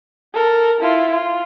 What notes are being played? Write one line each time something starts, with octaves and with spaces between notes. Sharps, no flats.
A4 A#4
E4 F4
F4